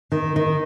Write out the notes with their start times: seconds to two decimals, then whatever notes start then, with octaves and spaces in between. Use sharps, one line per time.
0.12 D#3
0.36 D#3